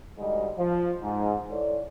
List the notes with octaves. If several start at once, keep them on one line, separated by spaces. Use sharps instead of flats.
D2 G#2 G3 G#3 D#5
F3
G#2
E4 A4 C#5 D5